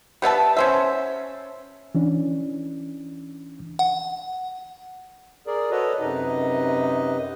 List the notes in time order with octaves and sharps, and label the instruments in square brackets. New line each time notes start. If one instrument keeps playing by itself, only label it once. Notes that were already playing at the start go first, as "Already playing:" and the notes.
[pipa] G3 B3 E5 A5
C#4 C5 E5
[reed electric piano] E3 C#4 D4
[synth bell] F#5
[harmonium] G#4 A#4 D5
F#4 A4 B4 C#5 D#5
F#2 C3 D#4 B4 D#5